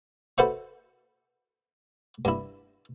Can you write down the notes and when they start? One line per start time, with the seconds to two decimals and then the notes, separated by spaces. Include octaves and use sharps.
0.38 F#4 A4 B4 C5 E5 C#6
2.25 G2 E4